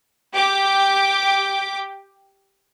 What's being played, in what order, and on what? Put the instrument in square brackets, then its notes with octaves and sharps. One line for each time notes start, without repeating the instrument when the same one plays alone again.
[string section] G4 D6